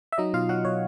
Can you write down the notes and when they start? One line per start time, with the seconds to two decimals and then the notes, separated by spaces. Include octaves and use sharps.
0.12 E5
0.18 F#3 D#4 D#5
0.34 B2 F4 F5
0.49 F#3 F#4 F#5
0.65 B2 C#5